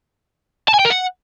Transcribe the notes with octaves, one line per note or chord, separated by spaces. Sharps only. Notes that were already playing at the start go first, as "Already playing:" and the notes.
A5
G#5
G5
A#4
F#5